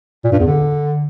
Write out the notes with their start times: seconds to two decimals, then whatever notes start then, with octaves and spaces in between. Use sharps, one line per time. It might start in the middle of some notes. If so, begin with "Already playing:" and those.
0.24 A#2
0.32 G2
0.39 E2
0.47 D3